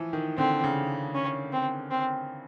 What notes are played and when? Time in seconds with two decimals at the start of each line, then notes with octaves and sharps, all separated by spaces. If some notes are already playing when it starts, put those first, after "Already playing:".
Already playing: E3 F3
0.13 D#3
0.38 D3 C4
0.64 C#3
1.15 C#4
1.52 C4
1.91 C4